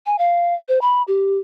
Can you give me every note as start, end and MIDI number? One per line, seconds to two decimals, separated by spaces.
0.06 0.18 80
0.18 0.54 77
0.68 0.81 72
0.81 1.02 83
1.08 1.38 67